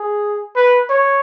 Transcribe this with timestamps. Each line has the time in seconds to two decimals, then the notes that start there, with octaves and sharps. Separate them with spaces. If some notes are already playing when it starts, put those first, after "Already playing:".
Already playing: G#4
0.56 B4
0.89 C#5